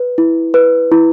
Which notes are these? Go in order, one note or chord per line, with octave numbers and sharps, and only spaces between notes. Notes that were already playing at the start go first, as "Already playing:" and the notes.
Already playing: B4
E4
B4
E4